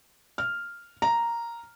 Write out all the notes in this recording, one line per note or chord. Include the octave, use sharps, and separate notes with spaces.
F6
A#5